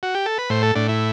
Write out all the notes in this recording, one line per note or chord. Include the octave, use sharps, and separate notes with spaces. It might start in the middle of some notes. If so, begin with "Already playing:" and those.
F#4
G4
A4
B4
A2 C5
A4
A2 D4
E4